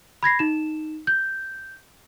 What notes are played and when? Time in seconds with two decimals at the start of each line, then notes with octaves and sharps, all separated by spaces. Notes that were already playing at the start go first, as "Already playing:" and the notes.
0.23 B5 G#6 A#6 C7
0.39 D#4 E7
1.07 G6